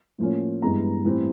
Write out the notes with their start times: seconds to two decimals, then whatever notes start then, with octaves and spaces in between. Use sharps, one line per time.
0.18 A2 F3 A#3 C#4
0.62 G2 E3 G#3 B3 A#5
1.05 A2 E3 G3 C4